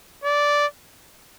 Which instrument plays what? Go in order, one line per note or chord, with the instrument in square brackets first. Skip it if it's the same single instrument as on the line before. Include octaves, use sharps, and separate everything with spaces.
[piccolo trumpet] D5